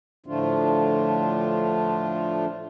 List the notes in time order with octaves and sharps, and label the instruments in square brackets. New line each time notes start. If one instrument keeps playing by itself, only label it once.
[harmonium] A2 D3 F3 A3 D4 F4